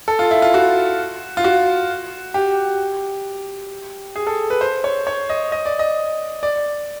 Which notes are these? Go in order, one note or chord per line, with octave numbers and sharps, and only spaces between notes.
A4
F4
E4
F4
F#4
F4
F#4
G4
G#4
A4
B4
C5
C#5
C#5
D#5
D#5
D5
D#5
D5